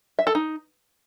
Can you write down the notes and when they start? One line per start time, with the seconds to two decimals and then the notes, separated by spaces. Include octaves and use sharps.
0.19 E5
0.27 A4
0.35 D#4